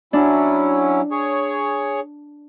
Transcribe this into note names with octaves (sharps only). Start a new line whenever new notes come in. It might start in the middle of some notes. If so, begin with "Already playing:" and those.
F#3 C#4 D4 E4
G#4 C#5